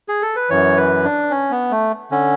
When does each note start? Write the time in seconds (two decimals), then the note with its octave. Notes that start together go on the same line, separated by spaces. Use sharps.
0.09 G#4
0.22 A4
0.36 B4
0.50 F#2 E3 C#5
0.77 B4
1.04 D4
1.31 C#4
1.51 B3
1.71 A3
2.11 D3 C#4